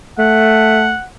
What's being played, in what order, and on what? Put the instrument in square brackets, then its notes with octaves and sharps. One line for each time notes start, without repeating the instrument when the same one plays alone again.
[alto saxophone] A3 [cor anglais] F#5